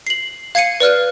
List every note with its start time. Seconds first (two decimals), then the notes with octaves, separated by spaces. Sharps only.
0.07 C7 F#7
0.55 F5 G#6 C7 C#7 D#7
0.80 B4 D5 F6 F#6